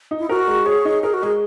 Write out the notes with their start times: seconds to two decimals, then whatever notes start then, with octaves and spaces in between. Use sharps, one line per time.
0.11 D#4
0.19 E4
0.29 F#4 A#4
0.48 G#3
0.66 G#4 C#5
0.85 D#4
1.03 G#4 A#4
1.14 F#4
1.22 G#3 G#4